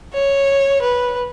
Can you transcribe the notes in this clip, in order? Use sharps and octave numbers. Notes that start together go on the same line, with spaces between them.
C#5
B4